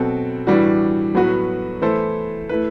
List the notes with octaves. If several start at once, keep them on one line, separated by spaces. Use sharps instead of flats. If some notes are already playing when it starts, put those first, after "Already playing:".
Already playing: B2 F#3 C4 F#4 A4
A2 E3 G3 D4 F#4
A2 F#3 B3 F#4 B4
E3 A3 E4 A4 C5
A3 E4 B4